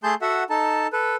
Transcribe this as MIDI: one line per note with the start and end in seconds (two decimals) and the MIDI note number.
0.03 0.15 57
0.03 0.15 68
0.03 0.15 81
0.03 0.15 84
0.03 0.15 91
0.22 0.44 66
0.22 0.44 69
0.22 0.44 76
0.22 0.44 78
0.50 0.87 63
0.50 0.87 69
0.50 0.87 81
0.93 1.16 69
0.93 1.16 71